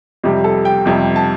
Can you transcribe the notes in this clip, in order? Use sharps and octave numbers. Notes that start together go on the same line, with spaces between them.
F2 C3 G3
A4
G5
F2 C3 G3
A5